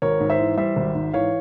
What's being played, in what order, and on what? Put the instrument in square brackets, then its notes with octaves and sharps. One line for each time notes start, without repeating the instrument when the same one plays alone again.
[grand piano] G#1 A#4 C#5
G#2
C5 E5
E3
G3 C5 E5
G#1
G#2
E3 C#5 F5